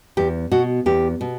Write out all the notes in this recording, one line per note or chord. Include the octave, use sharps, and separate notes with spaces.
E2 G4
B2 F#4
E2 G4
B2